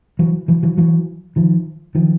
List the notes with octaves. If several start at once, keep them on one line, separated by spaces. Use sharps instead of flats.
E3 F#3
E3 F#3
E3 F#3
E3 F#3
D#3 F3
D#3 F3